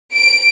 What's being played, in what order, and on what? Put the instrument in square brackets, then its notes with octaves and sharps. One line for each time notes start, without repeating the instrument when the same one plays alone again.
[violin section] D7